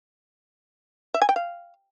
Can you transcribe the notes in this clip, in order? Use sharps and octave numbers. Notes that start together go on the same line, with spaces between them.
E5
G#5
G5
F5